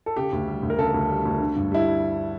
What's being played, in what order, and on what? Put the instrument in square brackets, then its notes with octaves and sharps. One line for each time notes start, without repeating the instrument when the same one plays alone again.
[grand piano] A4
C#3 G4
D2
G3
D2
A#4
C#3 A4
D2
G3
D2
D3
G2
G3 E4